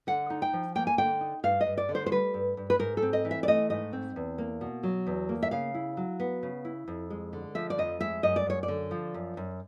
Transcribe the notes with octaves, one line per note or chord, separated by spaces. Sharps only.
D3 F#5
D#4
G5
F3
A#3 G5
G#5
D3 G5
D#4
G2 F5
D#5
G2
D5
D3
C5
C5
G3 B4
G2
G2
B4
G#2 A#4
A4
C4
D#5
E3
E5
D5
A3 D#5
G#2 D#5
C4
E2
A#3
B2
F#3
E2
A#3
E5
C#3 F5
E4
F#3
B3
C#3
E4
F2
G#3
D3
F3 E5
D5
F2 D#5
G#3 E5
F#2 D#5
D5
F#2 C#5
D5
D3
F3
F#2
F#2